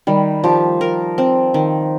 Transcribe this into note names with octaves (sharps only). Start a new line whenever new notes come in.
D#3 G3
F3 G4
A#4
C4
D#3